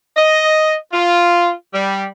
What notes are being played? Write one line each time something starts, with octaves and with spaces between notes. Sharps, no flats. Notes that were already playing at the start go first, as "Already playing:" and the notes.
D#5
F4
G3